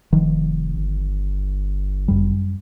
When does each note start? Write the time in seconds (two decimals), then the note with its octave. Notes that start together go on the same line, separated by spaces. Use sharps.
0.13 F1 D#3 F3
0.76 G1
2.08 F#2 G3